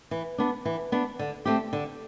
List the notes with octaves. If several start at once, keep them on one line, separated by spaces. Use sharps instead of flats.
E3
B3 D4
E3
B3 D4
D3
A3 C4 G4
D3